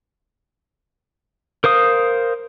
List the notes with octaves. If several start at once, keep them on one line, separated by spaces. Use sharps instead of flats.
A#4 C5 F5 D#6